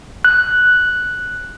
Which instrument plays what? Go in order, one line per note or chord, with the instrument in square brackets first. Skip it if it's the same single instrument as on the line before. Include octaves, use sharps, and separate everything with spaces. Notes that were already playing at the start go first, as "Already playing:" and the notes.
[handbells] F#6